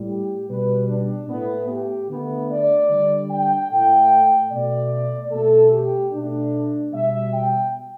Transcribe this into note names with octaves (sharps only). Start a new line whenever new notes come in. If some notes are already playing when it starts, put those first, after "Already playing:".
Already playing: A2 G3
G4
B2 G3 B4
D4
A2 A3 B3
G4
D3 A3 B3
D5
D3 G3
G5
A2 A3 G5
B2 A3 D5
B2 A3 A4
G4
B2 A3 D4
B2 G3 E5
G5